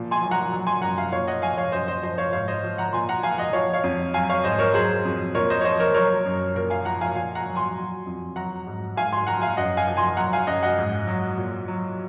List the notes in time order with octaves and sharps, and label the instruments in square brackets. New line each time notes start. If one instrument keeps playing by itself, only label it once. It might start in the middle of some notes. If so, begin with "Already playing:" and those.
Already playing: [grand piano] A#2 F3
G#5 C6
F#3 G#5
F#5 A#5
F#3
G#5 C6
F#2 F#5 A#5
F5 G#5
A#2 C#5 F5
D#5 F#5
F3 F5 G#5
C#5 F5
F#2 C5 D#5
C5 D#5
F3 C5 D#5
C#5 F5
G#2 C#5 F5
C5 D#5
F3
F#5 A#5
A#2 G#5 C6
F#5 A#5
F3 F5 G#5
D#5 F#5
F3 C#5 F5
C#5 F5
F2
F#3 F5 G#5
C#5 F5
G#2 C5 D#5
A#4 C#5
F#3 G#4 C5
F2
A#2 A#4 C#5
C5 D#5
C#5
F3 C5 D#5
A#4 C#5
F#3 A#4 C#5
F#2
A#2 A#4
F5 G#5
F3 F#5 A#5
F5 G#5
A#2 F5 G#5
F#5 A#5
F#3
G#5 C6
F#3
F2
F#3 F#5 A#5
G#2
G#2 F5 G#5
G#5 C6
F3 F#5 A#5
F5 G#5
F#2 D#5 F#5
F5 G#5
F3
G#5 C6
F#3 F#5 A#5
F5 G#5
F#2 D#5 F#5
D#5 F#5
G#2
F#3
A#2
F#3